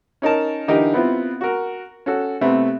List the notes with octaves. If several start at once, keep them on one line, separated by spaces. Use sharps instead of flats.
C#4 D#4 A#4 A5
D3 E3 D#4 G4 A#4
B3 C4 E4 F4
F#4 A#4
C#4 F#4 A4
C3 A3 B3 C4